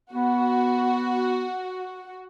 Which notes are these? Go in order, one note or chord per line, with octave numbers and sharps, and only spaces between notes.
B3 F#4